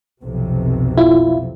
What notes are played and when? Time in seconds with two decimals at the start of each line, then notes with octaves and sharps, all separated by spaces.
0.23 B1 F2 C3
0.98 E4 F4